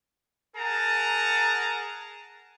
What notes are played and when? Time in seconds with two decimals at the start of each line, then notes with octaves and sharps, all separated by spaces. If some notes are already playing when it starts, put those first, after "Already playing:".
0.56 G#4 A#4 F#5 A5 A#5